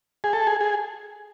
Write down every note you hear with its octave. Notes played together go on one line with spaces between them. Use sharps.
G#4
A4
G#4
G#4